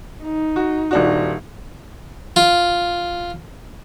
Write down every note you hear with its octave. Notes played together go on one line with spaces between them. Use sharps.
D#4
F#4
D#1 D4 F#4
F4